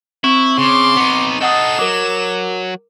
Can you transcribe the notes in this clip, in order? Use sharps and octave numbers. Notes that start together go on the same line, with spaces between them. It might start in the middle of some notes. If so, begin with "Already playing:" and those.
C4 E4 C#6
C#3 C6 D6
B3 D#4
D#4 A4 D#5 F#5 D#6 E7
F#3 A#4 D6